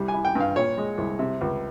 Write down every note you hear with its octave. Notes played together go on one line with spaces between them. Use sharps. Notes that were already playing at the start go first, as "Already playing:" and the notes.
Already playing: C2 G3
G#5
E4
G5
G2 F5
A#2 C#5
G#3
C2
C3
C#2